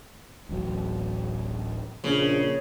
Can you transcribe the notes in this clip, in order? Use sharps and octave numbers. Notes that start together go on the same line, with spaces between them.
D1 A1 F#3
A#1 C#3